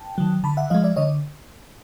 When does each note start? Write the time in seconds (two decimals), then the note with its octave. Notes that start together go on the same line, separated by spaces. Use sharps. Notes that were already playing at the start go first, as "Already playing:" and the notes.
Already playing: G5 A5
0.18 D#3 F#3
0.44 D3 A5 B5
0.57 E5 F#5
0.70 F3 G#3 D#5 F5
0.83 D5 E5
0.96 D3 C#5 D#5